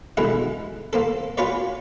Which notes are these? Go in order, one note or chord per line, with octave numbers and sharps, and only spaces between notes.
B2 D3 E3 G#3 D#4 E4
A#3 C4 A4
C#4 F4 F#4 B4 C#5 D5